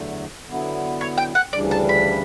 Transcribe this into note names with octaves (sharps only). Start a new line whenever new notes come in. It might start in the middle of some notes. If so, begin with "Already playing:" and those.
Already playing: E2 D3 F#3 A3
D3 F#3 B3 E4
C#5
G5
F#5
D2 C#3 E3 G3 D4 D5
A5
B5